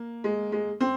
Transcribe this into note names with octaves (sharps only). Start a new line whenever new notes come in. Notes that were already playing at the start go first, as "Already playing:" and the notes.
Already playing: A#3
G#3
G#3
C4